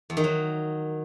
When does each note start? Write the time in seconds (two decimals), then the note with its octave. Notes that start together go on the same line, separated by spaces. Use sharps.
0.10 E2
0.17 D#3
0.24 F#3